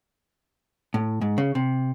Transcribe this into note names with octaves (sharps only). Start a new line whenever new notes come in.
A2
G#2
C#3
C3